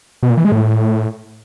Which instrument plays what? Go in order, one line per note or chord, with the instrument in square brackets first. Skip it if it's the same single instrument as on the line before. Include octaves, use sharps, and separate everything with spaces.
[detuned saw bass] B2
A#2
E3
G#3
A2